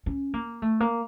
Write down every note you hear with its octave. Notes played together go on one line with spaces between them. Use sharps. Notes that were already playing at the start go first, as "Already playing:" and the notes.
C#4
A#3
A3
A#3